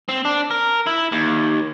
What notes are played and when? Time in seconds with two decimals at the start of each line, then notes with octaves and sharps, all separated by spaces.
0.09 C4
0.25 D4
0.51 A#4
0.87 E4
1.12 D#2